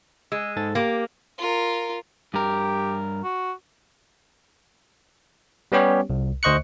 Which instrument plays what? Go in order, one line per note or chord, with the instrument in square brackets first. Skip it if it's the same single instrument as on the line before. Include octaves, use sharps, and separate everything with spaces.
[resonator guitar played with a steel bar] G#3 [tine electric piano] E6
[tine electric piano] G#2 A4 A6
[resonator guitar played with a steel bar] A#3 [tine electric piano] G4 D6
[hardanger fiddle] F4 A#4
[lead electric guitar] G2 A#4 [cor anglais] G4
[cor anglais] F#4
[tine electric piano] G3 B3 C#4 G4 C#5
C2
D2 C5 D#5 C#6 F#6 C#7